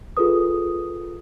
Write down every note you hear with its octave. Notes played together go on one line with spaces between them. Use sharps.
F4 G#4 A4 B4 D#6